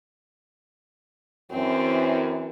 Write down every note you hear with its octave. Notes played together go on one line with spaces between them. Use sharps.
F#2 E3 C4